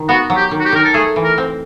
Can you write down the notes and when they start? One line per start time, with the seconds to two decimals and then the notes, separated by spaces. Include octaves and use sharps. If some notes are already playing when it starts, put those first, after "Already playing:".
Already playing: D#3
0.09 B3 F#4
0.30 F#3
0.37 G4
0.51 D#3
0.60 F#4
0.65 G4
0.72 D#3 A#4
0.84 A4
0.94 A3 G#4
1.16 E3
1.24 A#4
1.38 C4